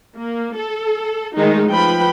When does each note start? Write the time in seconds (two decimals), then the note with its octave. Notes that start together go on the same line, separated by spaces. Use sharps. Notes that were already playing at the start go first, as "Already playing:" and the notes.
0.16 A#3
0.57 A4
1.36 D#3 G#3 A3 D#4
1.68 F3 B4 G5 B5